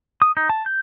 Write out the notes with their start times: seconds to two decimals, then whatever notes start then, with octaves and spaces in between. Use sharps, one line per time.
0.22 D#6
0.37 D#4
0.49 A5
0.66 G6